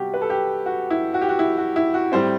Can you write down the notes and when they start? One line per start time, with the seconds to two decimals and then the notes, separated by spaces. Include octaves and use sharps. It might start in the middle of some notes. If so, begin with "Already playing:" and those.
Already playing: C3 G3 B3 F#4 G4
0.14 B4
0.22 A4
0.30 G4
0.66 F#4
0.90 E4
1.14 F#4
1.21 G4
1.29 F#4
1.39 E4
1.57 F#4
1.76 E4
1.94 F#4
2.12 A2 G3 C4 C5